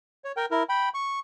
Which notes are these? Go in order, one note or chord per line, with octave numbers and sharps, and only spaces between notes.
C#5
A#4 G5
E4 A#4
G5 B5
C#6